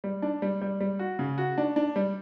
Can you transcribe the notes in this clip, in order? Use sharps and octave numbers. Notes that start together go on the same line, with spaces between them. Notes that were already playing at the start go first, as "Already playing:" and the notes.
G3
D4
G3
G3
G3
F#4
C#3
F#4
D4
D4
G3